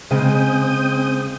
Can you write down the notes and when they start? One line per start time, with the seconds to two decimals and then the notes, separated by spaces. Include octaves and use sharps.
0.11 C#3 G#3 C4 G5 D#6